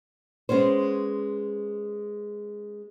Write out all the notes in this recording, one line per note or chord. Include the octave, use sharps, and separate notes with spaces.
G#3 B3 C#4 C5